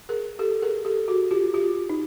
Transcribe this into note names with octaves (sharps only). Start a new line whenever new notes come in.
G#4 A#4
G4 A4
G#4 A#4
G4 A4
F#4 G#4
F4 G4
F4 G4
D#4